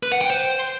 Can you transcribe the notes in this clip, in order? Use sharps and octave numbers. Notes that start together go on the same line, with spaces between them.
B4
F#5
G5
C5